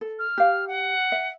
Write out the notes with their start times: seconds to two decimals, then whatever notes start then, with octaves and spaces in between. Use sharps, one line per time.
0.01 A4
0.18 F6
0.38 G4 F5
0.67 F#5
1.12 E5